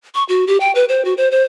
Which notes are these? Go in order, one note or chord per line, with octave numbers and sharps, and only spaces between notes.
C#6
F#4
G4
G5
B4
C5
F#4
C5
C5